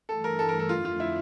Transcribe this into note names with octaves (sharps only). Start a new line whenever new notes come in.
G2 E3 A3 A4
A#4
A4
A#4
A4
F2 D3 F3 A3 D4 F4
F4
E4